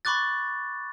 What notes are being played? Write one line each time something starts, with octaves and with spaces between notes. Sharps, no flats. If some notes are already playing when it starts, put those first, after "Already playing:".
B5 C#6 D6 F#6 A6